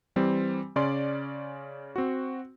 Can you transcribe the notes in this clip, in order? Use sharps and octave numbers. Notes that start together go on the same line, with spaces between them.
E3 G3 C4
C#3 C#4 D5 C6
C4 F#4